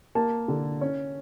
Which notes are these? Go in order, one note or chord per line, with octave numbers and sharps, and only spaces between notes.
A#3 A5
D3
C#4